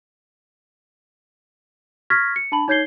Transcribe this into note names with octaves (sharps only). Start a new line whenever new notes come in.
C#6 F6 G#6 A#6 B6
C#7
D4 A5 B5 F#7
D#4 C#5 G6 G#6 C7 G7